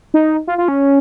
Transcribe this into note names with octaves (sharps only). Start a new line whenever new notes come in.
D#4
F4
F4
C#4